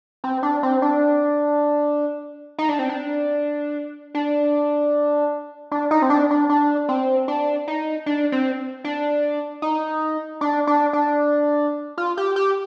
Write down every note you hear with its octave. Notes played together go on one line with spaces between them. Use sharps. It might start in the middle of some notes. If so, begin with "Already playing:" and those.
C4
D4
C4
D4
D#4
D4
C4
D4
D4
D4
D#4
C4
D4
D4
D4
C4
D4
D#4
D4
C4
D4
D#4
D4
D4
D4
F4
G4
G4